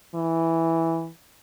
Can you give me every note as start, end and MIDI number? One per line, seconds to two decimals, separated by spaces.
0.14 1.08 52